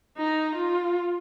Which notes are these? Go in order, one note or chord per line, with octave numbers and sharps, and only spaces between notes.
D#4
F4